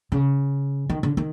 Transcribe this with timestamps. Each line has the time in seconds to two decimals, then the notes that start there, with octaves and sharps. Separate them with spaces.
0.12 C#3
0.90 D#3
1.03 D3
1.17 D#3